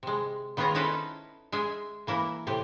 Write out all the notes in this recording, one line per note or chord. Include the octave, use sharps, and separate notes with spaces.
C3 G#3
D#3 B3 F4 G#4 C#5 A#5
C#4 D#4 E4 A4 B4 C5
G#3 G#4 E5 G#5
E3 A#3 E4
A2 C3 G4